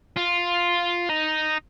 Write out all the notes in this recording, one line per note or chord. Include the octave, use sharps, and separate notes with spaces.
F4
D#4